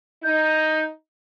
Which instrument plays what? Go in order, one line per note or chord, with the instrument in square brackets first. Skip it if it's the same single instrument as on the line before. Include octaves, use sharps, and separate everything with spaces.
[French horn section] D#4 [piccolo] G6